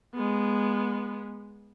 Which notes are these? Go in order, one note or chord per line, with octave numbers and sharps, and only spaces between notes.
G#3 B3